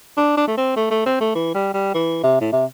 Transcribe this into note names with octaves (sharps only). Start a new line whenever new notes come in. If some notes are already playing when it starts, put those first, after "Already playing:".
D4
D4
A3
C4
A3
A3
C4
A3
E3
G3
G3
E3
C3
A2
C3